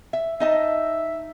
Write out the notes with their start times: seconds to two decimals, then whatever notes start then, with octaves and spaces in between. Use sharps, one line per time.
0.13 E5
0.40 D#4 D#5 E5 A5